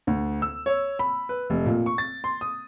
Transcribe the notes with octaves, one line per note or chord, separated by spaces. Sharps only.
D2
E6
C#5
B5
B4
F1
A#2
C#6
A6
C6
D#6